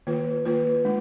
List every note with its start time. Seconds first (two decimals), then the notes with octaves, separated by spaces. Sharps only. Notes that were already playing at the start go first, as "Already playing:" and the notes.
0.07 D#3 A#3 F4 B4
0.45 D#3 A#3 F4 B4
0.85 G#3 D4